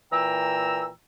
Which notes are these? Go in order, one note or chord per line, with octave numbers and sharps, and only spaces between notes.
A#2 E3 G5 A#5 E6